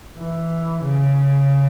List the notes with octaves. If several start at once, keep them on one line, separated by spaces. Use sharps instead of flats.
E3
C#3